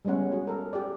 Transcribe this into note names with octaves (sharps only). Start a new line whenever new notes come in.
G3 G#3 B3 C#4 F#5
F#4 G#4
A4 A#4
G4 G#4 D5